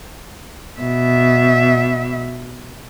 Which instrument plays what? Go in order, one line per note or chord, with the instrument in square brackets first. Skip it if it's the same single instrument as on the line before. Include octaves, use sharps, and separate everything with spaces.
[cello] B2 E5